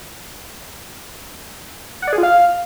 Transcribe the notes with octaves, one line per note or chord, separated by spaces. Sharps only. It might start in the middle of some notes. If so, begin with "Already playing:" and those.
F#5
D5
G#4
F4
F5